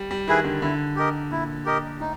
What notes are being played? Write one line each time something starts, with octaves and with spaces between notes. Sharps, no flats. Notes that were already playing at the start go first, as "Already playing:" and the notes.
Already playing: G3
G3
D#3 E4 G#4 B4
D3
D3 E4
G4 A#4 D#5
A#2 E4
G4 A#4 D#5
A2 D#4